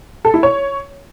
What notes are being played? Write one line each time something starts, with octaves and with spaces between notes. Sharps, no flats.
A4
E4
C#5